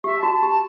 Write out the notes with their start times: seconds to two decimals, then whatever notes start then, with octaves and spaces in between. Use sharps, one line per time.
0.04 G4 E5
0.19 F#4 A5
0.33 A5
0.43 G4
0.48 A5